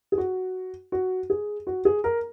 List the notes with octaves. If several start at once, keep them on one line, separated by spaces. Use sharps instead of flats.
G#4
F#4
F#4
G#4
F#4
G#4
A#4